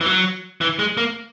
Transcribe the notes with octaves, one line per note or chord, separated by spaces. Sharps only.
E3
F#3
E3
G#3
A#3